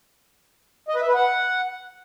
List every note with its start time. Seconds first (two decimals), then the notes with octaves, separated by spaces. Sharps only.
0.88 D#5
0.95 B4
1.02 E5
1.08 B4
1.15 F#5